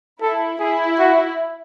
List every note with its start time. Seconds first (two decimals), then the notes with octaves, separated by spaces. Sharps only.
0.22 E4 A4
0.60 E4 G#4
0.99 F#4